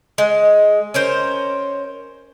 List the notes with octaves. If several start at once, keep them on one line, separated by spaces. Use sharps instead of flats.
G#3
C#4 A#4 C5